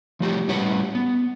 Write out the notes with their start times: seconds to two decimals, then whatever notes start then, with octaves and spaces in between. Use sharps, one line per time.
0.20 F3 A3 F#4 G4
0.48 A2 G3 C#4 F#4 B4 C#5
0.95 B3